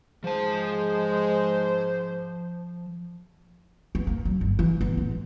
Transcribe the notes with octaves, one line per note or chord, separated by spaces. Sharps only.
G#2 F3 G#3 C5 A5
B3
A#3
F#3
G1
E3
B3
A1
G#3